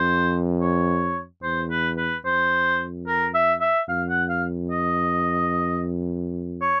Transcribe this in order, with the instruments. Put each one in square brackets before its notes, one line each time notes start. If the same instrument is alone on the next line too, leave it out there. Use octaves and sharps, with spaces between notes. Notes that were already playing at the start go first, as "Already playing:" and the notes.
Already playing: [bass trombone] F2 [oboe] C5
[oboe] C#5
[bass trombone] E2 [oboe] C5
[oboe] B4
B4
[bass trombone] F2 [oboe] C5
[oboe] A#4
E5
E5
[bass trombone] F2 [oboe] F5
[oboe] F#5
F5
D#5
C#5